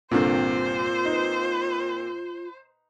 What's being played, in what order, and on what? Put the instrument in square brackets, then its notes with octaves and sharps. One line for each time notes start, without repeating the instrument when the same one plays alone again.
[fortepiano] C2 G2 D3 [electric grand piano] A#2 A#3 C4 [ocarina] F4 [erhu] C5
[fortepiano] D#4 B4